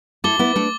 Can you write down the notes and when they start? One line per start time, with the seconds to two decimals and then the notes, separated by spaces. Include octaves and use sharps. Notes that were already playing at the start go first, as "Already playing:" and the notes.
0.24 E4 A4 D6 A6 G7
0.39 B3 E4
0.56 A3 D4